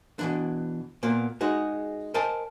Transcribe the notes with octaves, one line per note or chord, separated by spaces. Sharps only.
B2 E3 D4
A#2 A#3 B3
G#3 D#4 F#4 G#4
A#4 C5 D#5 G#5 A5